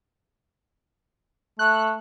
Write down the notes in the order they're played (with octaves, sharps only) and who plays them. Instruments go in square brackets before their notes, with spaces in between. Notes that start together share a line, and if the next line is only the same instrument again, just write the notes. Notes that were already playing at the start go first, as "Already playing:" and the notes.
[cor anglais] A3 [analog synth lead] F#6